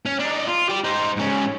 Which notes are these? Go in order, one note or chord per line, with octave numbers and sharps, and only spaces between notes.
C#4
D4 D#4
F4
G4 D5
D#4 C5
G#2 C#4